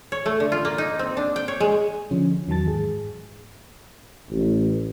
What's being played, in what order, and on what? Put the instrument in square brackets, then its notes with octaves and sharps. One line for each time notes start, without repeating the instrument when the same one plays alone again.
[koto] C#5
A3
D3
F4
A#3
D#4
C4
D4
G5
C#5
G#3
[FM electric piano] D3 F3 C#4
E2 D#3 F#3 A5 A6
G#2 G#4
[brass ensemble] A1